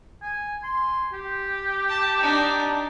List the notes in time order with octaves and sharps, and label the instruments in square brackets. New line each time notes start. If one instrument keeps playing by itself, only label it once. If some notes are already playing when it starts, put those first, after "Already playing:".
[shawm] G#5
C6
G4
[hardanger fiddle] A5
D4 D#4